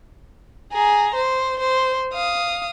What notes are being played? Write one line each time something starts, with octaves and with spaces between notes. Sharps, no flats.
G#4 A#5
C5
C5
F5 D#6